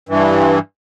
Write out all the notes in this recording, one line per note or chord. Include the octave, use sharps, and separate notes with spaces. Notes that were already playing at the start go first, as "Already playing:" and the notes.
G2 E3